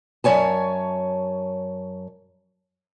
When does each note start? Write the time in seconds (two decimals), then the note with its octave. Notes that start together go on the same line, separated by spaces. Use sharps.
0.24 F#2 D#3 C#5 G#5 A5